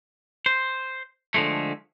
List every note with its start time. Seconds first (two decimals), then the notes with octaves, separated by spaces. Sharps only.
0.46 C5
1.34 D3 F3 G#3 A3